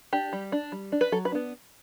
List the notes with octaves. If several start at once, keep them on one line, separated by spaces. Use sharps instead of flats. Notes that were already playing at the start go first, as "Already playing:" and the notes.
D4 G4
G3
D4
G3
D4
B4
F#3 A4
B4
B3 D4